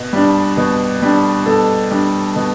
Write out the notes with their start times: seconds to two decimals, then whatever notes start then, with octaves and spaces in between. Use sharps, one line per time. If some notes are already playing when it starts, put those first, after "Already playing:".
Already playing: B2
0.13 G3 D4
0.57 B2
1.02 G3 D4
1.46 B2 A4
1.91 G3 D4
2.36 B2